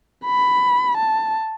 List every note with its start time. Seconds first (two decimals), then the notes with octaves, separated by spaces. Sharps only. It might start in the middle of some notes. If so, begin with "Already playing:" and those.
0.25 B5
0.97 A5